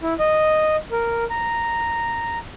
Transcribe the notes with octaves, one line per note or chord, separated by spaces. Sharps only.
E4
D#5
A#4
A#5